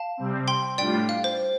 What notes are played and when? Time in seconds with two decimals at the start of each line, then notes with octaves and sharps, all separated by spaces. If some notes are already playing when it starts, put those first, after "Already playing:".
Already playing: F5 A5
0.17 C3 G3 C4
0.48 G5 C6
0.78 A2 G3 D4 F4 D5 G5
1.09 F5
1.24 C5